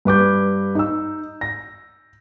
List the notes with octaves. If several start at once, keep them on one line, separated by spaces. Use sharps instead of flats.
G2 B4 D6 G6
D#4 E6
A#6